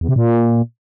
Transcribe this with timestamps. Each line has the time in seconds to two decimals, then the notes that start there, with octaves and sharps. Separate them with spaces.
0.01 E2
0.09 C3
0.16 A#2